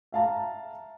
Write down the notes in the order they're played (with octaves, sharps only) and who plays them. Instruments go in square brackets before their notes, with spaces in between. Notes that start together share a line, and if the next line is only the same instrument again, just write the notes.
[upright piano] E5 F5 A5 A#5